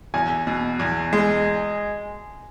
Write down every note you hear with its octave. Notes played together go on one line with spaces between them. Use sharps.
E2 G#5
B2
E2
G#3